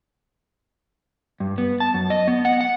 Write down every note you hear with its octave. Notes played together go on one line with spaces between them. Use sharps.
G2
B3
A5
F#2
D#5
B3
F#5
F#5